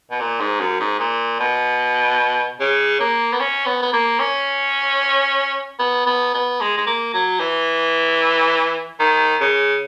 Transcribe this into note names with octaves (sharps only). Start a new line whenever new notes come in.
B2
A#2
G#2
F#2
G#2
A#2
B2
C#3
A#3
B3
C#4
B3
B3
A#3
C#4
B3
B3
B3
G#3
G#3
A#3
F#3
E3
D#3
C#3